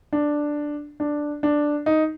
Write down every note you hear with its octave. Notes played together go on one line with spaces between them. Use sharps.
D4
D4
D4
D#4